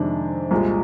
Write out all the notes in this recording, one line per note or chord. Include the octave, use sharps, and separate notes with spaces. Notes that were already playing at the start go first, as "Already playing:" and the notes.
Already playing: F2 C3 D#3 G#3 D4
C2 A#2 G#3